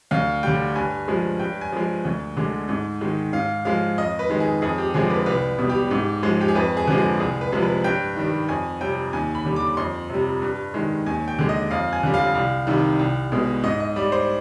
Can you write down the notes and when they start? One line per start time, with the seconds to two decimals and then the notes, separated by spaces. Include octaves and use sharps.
0.11 D2 F5
0.43 D3 G3 G5
0.75 G2 G#5
1.08 F3 G#3
1.39 G2 G5
1.61 G#5
1.72 F3 G#3
2.05 D2
2.37 D3 G#3
2.69 G#2
3.01 D#3 G#3
3.33 G#2 F5
3.65 F3 G#3 F5
3.97 F2 D#5
4.19 B4
4.30 D#3 G#3
4.40 G#4
4.62 F2 G#4
4.78 G4
4.94 D3 F3 G#3 G#4
5.10 B4
5.26 C2 B4
5.58 B2 G3
5.69 G4
5.91 G#2
6.23 F3 G#3
6.41 G4
6.48 G#4
6.55 F2 B4
6.77 G#4
6.87 D3 F3 G#3
6.98 G#4
7.20 C2 G#4
7.41 B4
7.52 C3 F3 G#3
7.62 B4
7.84 G2 G5
8.16 D#3 G3
8.49 F2 G#5
8.81 C3 G3 G5
9.13 D#2 G#5
9.35 B5
9.45 D3 G3
9.56 D6
9.77 F2 C6
10.10 C3 G3
10.42 G2
10.74 D#3 G#3
11.06 D#2 G#5
11.28 G5
11.39 D3 G#3
11.49 D#5
11.71 F2 F5
11.93 G#5
12.03 D3 G3
12.14 F5
12.35 C2
12.67 C3 D#3 G3
12.99 C2
13.32 B2 G#3
13.64 G#2 D#5
13.80 D#5
13.96 G3 D5
14.12 C5